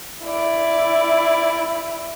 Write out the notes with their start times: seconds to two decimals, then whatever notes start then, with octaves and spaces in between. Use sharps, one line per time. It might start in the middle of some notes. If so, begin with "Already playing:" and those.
0.23 E4 D5